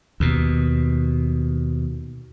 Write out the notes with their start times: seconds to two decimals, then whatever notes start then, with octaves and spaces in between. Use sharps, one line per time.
0.20 D#2 B2